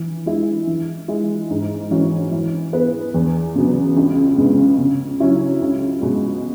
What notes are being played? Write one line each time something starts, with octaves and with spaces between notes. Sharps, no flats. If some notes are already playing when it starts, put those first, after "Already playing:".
Already playing: E3
G#3 E4
E3
G#3 E4
G#2
E3 C#4 F#4
E3
B3 G#4 B4
E2
C#3 F#3 B3
C#2
C#3 G#3 B3
C#3
F#3 C#4 E4
C#2
B2 G#3